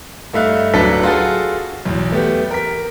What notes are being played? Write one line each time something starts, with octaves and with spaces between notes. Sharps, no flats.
G2 A3 D#4 E5 F5 F#6
D1 F#3 D4 A4 B4 B6
F4 F#4 G#4 A4
B1 E2
A3 B3 G4
A#4 B6